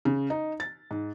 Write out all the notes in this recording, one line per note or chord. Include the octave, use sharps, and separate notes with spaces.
C#3
D#4
A6
G#2